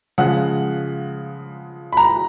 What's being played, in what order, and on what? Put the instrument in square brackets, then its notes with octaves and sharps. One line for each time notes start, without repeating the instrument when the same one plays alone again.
[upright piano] C#3 F3 G#3 F#5
B5
A#5